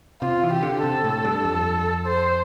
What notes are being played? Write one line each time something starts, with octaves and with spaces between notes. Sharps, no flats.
C3 F4
E3
G4
D3
C3 A4
A2
G2
F2
C5